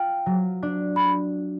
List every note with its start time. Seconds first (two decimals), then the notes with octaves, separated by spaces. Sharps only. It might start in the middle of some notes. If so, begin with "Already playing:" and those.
Already playing: F4 G5
0.26 F#3
0.63 D4
0.96 B5